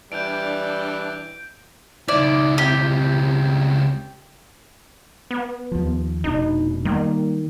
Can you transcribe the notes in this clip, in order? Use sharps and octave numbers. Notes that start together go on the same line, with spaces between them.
E3 G3 D4 G6 D7
C#2 D#4 E4 D5
C4 G4
B3
D#2 F3
F1 B2 D4 D#4
D#3 G3 A#3